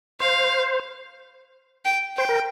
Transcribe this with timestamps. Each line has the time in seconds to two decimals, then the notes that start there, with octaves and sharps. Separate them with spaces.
0.20 C5 F5
1.85 G5
2.17 C5 G5
2.29 A#4